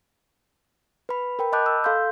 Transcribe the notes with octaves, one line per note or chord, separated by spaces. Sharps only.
B4 B5
A#4 G5 B5
D#5 A5 B5 D6 F#6 G6
E6
A4 F5 C6 G6